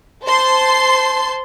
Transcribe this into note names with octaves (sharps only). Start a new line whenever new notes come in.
C5 A5 C6 C7